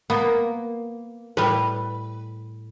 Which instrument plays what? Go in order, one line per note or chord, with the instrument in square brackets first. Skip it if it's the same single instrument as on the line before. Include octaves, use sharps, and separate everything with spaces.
[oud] A#3 [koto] B3
[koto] A2 G3 [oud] B4